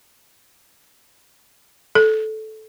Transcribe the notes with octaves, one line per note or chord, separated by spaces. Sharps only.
A4